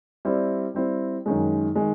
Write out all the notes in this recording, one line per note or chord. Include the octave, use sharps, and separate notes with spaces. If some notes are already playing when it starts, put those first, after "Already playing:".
G3 C4 E4
G3 C4 E4
F#2 D#3 G#3
D#3 G#3